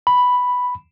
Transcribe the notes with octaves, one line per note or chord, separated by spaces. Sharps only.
B5